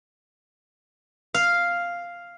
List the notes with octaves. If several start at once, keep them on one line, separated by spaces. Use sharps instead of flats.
F5